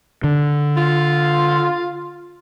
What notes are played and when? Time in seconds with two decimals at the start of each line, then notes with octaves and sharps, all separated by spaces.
0.24 D3
0.77 F4